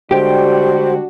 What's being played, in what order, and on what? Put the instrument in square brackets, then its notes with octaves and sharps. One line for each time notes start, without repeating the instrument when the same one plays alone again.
[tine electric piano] D3 G#3 G5 [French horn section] G3 D4 F#4 [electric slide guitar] G4 [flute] C5